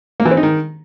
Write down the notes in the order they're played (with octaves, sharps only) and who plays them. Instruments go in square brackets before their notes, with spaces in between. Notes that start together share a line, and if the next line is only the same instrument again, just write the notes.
[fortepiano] A#3
E3
C4
D#4
D#3